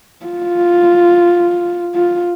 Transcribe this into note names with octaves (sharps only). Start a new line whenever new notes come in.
F4
F4